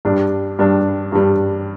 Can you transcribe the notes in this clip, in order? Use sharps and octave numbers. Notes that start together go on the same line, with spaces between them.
G2 G3 D4
G2 G3 D4
G2 G3 D4